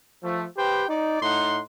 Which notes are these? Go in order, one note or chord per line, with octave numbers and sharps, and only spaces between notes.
F3 A3
G4 B4 C5 G5
D#4 D5
A2 D#4 F#5 C6